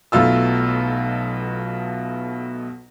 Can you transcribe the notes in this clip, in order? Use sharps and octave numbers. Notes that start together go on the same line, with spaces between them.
B1 B2 A3 F4 E6